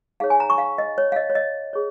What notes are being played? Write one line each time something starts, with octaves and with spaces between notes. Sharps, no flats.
D#4 G#4 C#5 F5
G#5
A#5
C#6
F5
D#5
C#5
F5
D#5
C#5
D#5
G#4 C#5